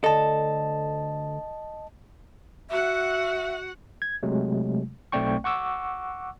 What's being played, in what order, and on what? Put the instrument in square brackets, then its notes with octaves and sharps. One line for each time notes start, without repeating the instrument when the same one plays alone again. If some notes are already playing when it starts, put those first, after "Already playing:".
[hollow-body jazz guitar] D2 A4 [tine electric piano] D#5 A5
[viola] F#4 F#5 [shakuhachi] E5
[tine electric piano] G#6
C3 F#3 G#3 A3
B1 A3 C4 D5 G5 C#6
F#5 C#6 D6 E6